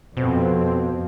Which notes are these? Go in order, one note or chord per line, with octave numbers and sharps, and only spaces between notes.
F2 B2 C4